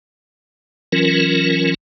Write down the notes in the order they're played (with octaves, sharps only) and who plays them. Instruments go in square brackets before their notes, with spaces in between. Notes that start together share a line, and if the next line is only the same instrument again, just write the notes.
[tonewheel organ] E3 F#3 C#4 F4 A#4